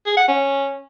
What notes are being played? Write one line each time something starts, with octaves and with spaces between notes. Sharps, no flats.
G#4
F#5
C#4